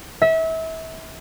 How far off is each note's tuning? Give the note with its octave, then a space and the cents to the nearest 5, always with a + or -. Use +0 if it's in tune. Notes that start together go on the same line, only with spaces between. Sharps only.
E5 -30